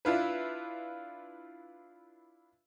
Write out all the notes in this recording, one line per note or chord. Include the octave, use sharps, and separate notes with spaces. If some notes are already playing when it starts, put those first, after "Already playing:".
D4 E4 F4 B4